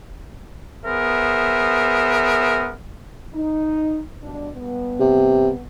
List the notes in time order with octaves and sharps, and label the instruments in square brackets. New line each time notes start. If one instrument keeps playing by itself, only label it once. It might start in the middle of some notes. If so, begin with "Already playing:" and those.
[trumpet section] B3 G#4 A#4 C5 E5
[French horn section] D#4
G2 B2 D4
G2 B3
[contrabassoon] C3